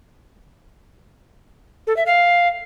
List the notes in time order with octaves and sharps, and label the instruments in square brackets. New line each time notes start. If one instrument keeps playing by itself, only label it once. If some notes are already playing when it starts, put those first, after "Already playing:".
[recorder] A4
E5
F5